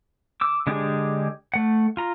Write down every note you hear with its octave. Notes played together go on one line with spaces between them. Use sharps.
D6 E6
D3 G#3 D4 G4 G#4
A3 F#5
F4 A#5